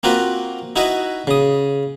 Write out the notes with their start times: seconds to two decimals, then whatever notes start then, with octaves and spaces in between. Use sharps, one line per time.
0.03 A#3 C4 F4 F#4 A#4 B4
0.76 D#4 E4 F#4 B4 D#5 E5
1.27 C#3 D#6